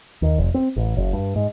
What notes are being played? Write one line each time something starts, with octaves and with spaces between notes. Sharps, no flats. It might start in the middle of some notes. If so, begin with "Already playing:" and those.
D#2
F1
C4
A1
F#1
G2
G#2